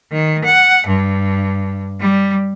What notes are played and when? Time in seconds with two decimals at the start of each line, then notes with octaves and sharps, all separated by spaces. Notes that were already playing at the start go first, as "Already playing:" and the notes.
0.12 D#3
0.44 F#5
0.87 G2
2.00 G3